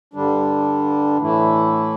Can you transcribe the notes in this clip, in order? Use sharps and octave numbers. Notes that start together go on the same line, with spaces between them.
G2 D3 G3 D4
A2 E3 A3 E4